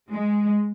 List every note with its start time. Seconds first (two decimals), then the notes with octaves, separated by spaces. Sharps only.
0.12 G#3